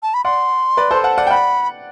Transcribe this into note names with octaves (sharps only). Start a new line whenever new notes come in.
A5
B5
D5 F#5 C6
B4 D5
A4 C5
F#5 A5
D5 F#5
G5
D5 F#5 B5